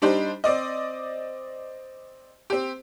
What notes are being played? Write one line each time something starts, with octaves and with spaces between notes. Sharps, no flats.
G3 D4 D#4 G4 C5
C4 D5 D#5
C4 G4